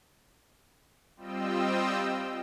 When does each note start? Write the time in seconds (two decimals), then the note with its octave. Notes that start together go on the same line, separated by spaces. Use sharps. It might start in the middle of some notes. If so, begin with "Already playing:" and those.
1.16 G3 C4 F4 D#5 G5 E6